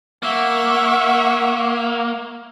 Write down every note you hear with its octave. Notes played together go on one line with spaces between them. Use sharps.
A#3 E5 F#5 C#6